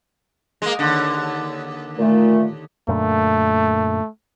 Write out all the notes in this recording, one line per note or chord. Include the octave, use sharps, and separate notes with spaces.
G#3 A#3
D#2 D3
A#2 A3
F#2 A#2 D3 A3